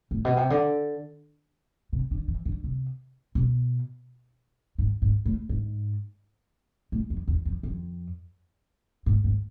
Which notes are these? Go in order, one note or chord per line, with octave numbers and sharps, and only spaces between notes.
A2
B2
C3
D3
C3
D3
E3
D3
C3
B2
G#2
G#2
A2
G#2
A2
F2
E2
F2
F2
G#2
G#2